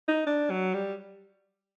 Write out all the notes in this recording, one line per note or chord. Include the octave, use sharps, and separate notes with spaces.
D#4
D4
F#3
G3